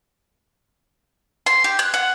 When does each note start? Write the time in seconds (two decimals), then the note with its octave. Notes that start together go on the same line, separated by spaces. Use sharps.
1.46 C6
1.64 G4
1.79 F#6
1.94 F#5